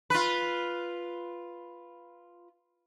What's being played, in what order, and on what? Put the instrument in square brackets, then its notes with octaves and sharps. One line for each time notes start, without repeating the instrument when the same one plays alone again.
[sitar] F4 B4